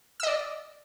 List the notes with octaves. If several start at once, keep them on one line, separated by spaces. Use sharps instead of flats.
D5 D#5 E6